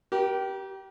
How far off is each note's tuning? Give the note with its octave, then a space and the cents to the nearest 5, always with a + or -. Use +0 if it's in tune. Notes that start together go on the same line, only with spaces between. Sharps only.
G4 -20 A#4 +35